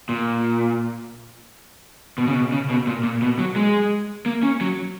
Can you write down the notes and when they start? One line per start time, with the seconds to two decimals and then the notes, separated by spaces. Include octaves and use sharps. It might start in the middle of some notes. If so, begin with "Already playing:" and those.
0.09 A#2
2.18 B2
2.27 C#3
2.35 B2
2.52 C#3
2.70 B2
2.87 A#2
3.04 A#2
3.22 B2
3.39 F#3
3.56 G#3
4.26 A#3
4.43 C#4
4.61 F#3